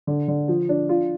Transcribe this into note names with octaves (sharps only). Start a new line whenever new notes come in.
D3
D3
F3
D4
F4